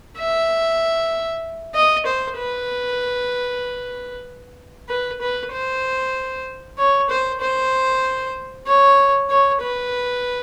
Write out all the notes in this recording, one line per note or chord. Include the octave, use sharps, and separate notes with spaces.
E5
D#5
C5
B4
B4
B4
C5
C#5
C5
C5
C#5
C#5
B4